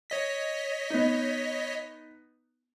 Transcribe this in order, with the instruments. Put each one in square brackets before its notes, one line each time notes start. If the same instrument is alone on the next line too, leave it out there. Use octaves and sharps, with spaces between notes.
[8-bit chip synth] C#5 D#5 B6
[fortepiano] B3 D#4